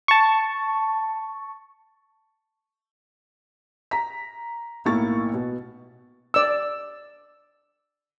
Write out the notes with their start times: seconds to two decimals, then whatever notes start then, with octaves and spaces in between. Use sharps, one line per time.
0.08 A5 C#6
3.91 A#5 B6
4.85 B1 A2 A#3 E4 C#6 A6
5.34 B2
6.34 D5 E6